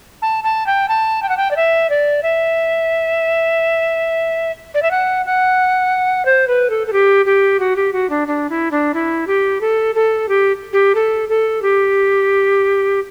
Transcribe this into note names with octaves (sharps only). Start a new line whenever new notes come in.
A5
A5
G5
A5
G5
F#5
G5
D5
E5
D5
E5
D5
E5
F#5
F#5
C5
B4
A4
A4
G4
G4
F#4
G4
F#4
D4
D4
E4
D4
E4
G4
A4
A4
G4
G4
A4
A4
G4